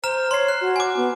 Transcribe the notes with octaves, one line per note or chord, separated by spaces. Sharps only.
C5 A#5 F6 E7
C#5 C6 C7
F#6
F#4
G#5 D6
B3